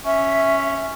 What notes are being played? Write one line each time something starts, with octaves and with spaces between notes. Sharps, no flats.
C#4 E5